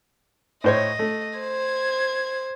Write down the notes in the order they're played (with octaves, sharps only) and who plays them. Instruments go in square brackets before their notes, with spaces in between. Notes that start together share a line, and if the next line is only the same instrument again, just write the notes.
[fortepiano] A2 C5 C#5 [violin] D#5
[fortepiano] A3
[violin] C5 G#6